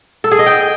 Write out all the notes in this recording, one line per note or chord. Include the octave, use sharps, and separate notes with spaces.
A4
G#4
D#5
G5